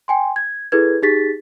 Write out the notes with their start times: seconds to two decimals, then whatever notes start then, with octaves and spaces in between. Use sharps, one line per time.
0.08 G5 G#5 C6
0.36 G#6
0.72 E4 G#4 A4 B4 G#6
1.02 D#4 G4 G#4 A6 B6